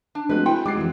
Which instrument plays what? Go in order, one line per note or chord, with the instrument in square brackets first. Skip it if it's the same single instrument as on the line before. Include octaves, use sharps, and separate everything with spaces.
[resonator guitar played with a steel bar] D4
[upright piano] F3 G#3 F#6 [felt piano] A3 C4 F#4 [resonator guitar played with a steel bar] B4
[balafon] E4 [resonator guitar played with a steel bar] G5 [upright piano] G#5 B5
[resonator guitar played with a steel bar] F#3 [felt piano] G#3 [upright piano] D6 A6 C7
[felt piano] F2 E3